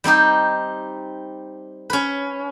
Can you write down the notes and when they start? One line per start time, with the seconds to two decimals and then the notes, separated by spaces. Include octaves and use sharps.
0.04 G3 C4 D#4 G4
1.90 C#4 B4